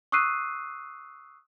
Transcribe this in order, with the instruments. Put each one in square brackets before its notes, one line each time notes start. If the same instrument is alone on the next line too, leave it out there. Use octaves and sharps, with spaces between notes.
[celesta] C#6 D#6 E6 F#6 C7 D#7